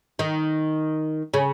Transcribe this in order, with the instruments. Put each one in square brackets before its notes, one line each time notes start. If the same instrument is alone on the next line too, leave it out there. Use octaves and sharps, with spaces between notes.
[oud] D#3
C#3